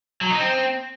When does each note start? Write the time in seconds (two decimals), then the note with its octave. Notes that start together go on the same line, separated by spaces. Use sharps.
0.21 F#3
0.30 D#4
0.39 C4